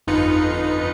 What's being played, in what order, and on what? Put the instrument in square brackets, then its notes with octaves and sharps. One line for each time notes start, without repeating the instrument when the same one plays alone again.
[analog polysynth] G1 F2 D#4 F4 B4 C#7